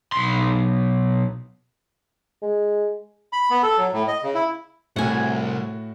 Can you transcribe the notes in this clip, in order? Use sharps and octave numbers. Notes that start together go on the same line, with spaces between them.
B1 C6
G#3
B5
B3
A4
F#3
A2
D#5
C#3
E4
C2 A2 F#4 F#5 G#5